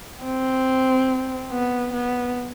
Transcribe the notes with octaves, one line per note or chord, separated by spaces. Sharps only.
C4
B3
B3